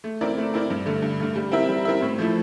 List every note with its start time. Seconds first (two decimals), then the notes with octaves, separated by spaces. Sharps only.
0.04 A3
0.21 C4 E4 A#4 D5
0.37 A3
0.54 C4 E4 A#4 D5
0.70 G2
0.86 D3 A3
1.02 G2
1.20 D3 A3
1.36 G3
1.52 C4 E4 A#4 E5
1.69 G3
1.85 C4 E4 A#4 E5
2.02 A2
2.18 F3 A3 E4